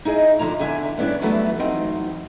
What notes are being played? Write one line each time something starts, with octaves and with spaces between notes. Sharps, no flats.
D#4 E4 G#4 D#5
D3 F3 E4 A#5
E2 D3 E5 G#5
G2 B3 C#4 D4 E4
E3 F#3 G3 A3 B3 E4
E3 F#3 C4 D#4